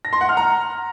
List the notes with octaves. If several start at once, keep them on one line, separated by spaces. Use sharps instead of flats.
A#6
C6
F#5
F6
A#5